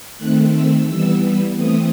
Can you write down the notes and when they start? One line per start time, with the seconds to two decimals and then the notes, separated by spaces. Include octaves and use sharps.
0.18 D#3 A3 C4 F#6
0.52 E6
0.86 E3 G3 B3 E6
1.55 E3 A3 C4 D#6